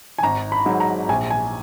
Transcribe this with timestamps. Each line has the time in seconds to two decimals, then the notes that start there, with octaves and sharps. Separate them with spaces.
0.18 G#5
0.23 G#1 A#5
0.52 B5
0.66 G#2 F#3
0.80 A#5
1.09 A#1 G#5
1.31 G#5